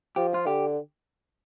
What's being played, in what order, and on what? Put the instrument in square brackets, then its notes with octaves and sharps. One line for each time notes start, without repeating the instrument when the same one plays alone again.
[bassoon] F3 [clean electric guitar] G4
[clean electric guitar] F4
[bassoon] D3 [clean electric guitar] G4